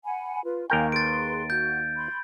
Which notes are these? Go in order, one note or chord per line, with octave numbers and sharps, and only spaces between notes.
F#5 G#5 B5
F4 B4
D#2 A#4 F5 G5 G#5 C#6
G#4 B4 C6 A6 D7
F#4 G6
B5 C6